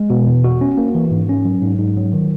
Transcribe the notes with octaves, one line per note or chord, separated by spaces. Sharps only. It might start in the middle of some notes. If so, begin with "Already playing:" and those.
Already playing: G#3
B2
E2
F#4
C#4
A#3
E3
G#2
C#4
F#3
G#2
G#2
F#3
D#3